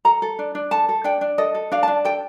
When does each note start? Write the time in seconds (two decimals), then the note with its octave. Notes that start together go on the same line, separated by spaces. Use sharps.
0.05 A4 A#5
0.22 A4
0.39 D4
0.55 D4
0.71 A4 A5
0.89 A4
1.04 D4 G5
1.21 D4
1.38 A4 D#5
1.55 A4
1.72 D4 F5
1.83 D4 A5
2.05 A4 G5